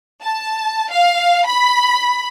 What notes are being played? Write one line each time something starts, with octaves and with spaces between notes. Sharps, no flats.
A5
F5
B5